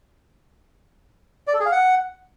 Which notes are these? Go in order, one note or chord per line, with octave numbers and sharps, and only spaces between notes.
D5
A4
G#4
F5
F#5